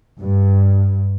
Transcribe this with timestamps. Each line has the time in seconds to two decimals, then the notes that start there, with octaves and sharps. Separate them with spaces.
0.21 G2